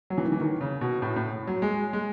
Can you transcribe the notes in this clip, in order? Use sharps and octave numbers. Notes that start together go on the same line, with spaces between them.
F#3
E3
D#3
E3
D#3
C#3
B2
A2
A2
F#3
G#3
G#3